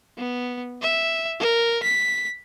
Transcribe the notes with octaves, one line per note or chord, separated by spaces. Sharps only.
B3
E5
A#4
B6